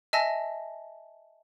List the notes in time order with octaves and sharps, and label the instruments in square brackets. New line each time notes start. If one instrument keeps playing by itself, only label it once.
[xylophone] D#5 E5 G#5 A5 E6 A#6